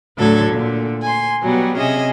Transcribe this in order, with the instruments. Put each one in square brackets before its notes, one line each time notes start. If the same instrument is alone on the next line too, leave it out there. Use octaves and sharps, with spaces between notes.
[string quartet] D2 A2 D3 F#3 A4 G#6
A#2 D3
G#5 C6
B2 F#3 G3 B3
C3 C#4 G#4 D#5 E5